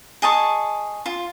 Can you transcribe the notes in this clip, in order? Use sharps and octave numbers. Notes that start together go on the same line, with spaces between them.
G#4 D#5 A5 C#6
F4